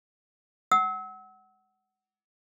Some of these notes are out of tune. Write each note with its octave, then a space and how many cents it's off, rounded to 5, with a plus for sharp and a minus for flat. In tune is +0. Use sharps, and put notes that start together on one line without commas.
F#5 +20 E6 -35